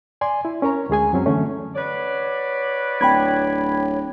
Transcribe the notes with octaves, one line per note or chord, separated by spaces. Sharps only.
D5 G#5 C6
E4
C#4 A#4 C#5 A#5
D2 G#3 G#4 G#5
F#2 F#3 C4 C#4
D3 E3 A3 C#4
F#4 B4 C#5 D5
D1 G5 B5 G#6